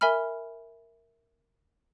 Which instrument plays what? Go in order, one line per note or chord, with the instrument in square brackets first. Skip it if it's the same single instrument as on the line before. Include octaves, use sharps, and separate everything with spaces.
[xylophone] A#4 E5 G#5 B5 F6